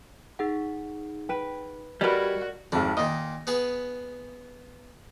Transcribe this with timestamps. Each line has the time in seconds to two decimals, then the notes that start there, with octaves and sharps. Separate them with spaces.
0.39 D#4 G#4 F#5
1.29 B4 G5
2.01 G3 F#4 A#4 B4 D5 D#5 G#6
2.72 G#1 F2 D4
2.97 A#2 D#3 D#5
3.47 B3 G#4 B4